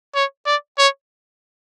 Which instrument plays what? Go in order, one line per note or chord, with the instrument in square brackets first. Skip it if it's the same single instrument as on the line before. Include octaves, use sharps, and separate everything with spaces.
[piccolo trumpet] C#5
D5
C#5